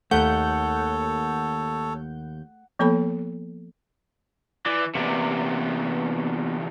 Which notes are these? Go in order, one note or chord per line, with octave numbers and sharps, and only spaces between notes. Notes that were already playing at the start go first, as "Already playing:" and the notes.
D#2 A3 A4 C#5 F#5 G6
F3 A#3 B3 A4 C#5 B5
E3 D5
E2 C3 A#3 B3 D5